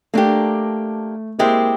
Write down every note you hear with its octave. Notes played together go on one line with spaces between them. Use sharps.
A3 A#3 D4 G4
G#3 A#3 C4 E4 G4